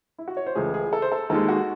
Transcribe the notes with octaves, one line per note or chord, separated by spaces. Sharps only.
E4
F#4
C#5
C5
C#2 C#3 E3 A3 G#4
G#4
A4
C5
A4
D#2 D#3 G#3 A4
F#4